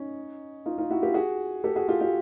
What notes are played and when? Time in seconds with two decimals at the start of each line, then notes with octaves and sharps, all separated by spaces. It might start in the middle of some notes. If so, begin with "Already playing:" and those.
Already playing: C#4 D#4
0.66 D#4 F4
0.78 D#4 F4
0.90 E4 F#4
1.02 F4 G4
1.14 F#4 G#4
1.64 G4 A4
1.76 F#4 G#4
1.88 F4 G4
2.01 F4 G4